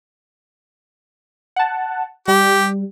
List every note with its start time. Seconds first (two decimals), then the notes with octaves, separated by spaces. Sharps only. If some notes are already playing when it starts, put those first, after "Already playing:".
1.56 F#5 A5
2.28 G3 G4